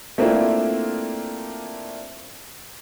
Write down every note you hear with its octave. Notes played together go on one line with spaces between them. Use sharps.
A3 A#3 C4 D4 E4 F4